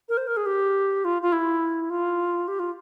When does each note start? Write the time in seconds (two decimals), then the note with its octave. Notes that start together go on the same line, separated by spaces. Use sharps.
0.09 A#4
0.17 C5
0.27 A#4
0.37 G#4
0.46 G4
1.05 F4
1.22 F4
1.33 E4
1.90 F4
2.48 G4
2.59 F4